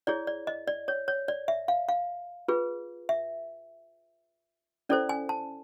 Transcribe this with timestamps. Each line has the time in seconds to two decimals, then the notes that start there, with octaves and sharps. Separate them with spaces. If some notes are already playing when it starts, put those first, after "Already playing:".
0.07 E4 G#4 C#5 D5
0.27 D5
0.47 D#5
0.68 D5
0.88 C#5
1.08 C#5
1.28 D5
1.48 E5
1.68 F5
1.89 F5
2.48 F4 G#4 B4
3.09 E5
4.89 C#4 E4 A4 C5 D5
5.09 G#5
5.29 A5